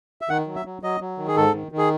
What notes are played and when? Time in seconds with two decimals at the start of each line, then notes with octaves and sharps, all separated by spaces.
0.22 E5
0.29 D#3 F#5
0.47 F#3
0.56 E5
0.66 F#3
0.82 F#3 D#5
1.01 F#3
1.18 D#3
1.28 G#4
1.36 G#2 A4
1.54 D#3
1.72 D#3
1.78 G#4